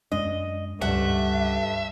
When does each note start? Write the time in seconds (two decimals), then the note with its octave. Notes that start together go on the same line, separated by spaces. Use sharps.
0.12 F#2 G#3 D4 D#5
0.81 C#2 G2 A3 E5 F#5